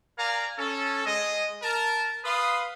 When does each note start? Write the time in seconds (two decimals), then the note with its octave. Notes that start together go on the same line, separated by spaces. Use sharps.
0.18 A#4 D5 F5 G#5 A#5
0.59 C#4 A4
1.06 G#3 D#5
1.63 A#4 A5
2.25 B4 F5 C6 D#6